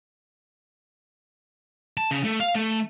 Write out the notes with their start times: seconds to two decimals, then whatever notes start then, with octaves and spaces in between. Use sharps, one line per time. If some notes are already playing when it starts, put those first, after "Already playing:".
1.97 A5
2.11 C#3
2.24 A3
2.40 F5
2.55 A3